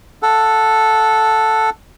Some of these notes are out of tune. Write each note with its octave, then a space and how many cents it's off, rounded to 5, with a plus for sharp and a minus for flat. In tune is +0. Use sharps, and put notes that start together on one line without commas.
A4 +0 F#5 -15